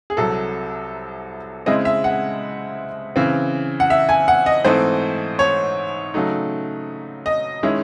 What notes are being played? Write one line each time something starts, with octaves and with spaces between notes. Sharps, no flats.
G#4
C2 C3 F#3 A4
C#3 G#3 C4 E4 D#5
E5
F#5
C#3 E3 C4
F#5
E5
G#5
F#5
D#5
G#2 E3 A3 C4 D#4 C5
C#5
C#3 F#3 A3 D#4
D#5
D#3 G#3 C#4 E4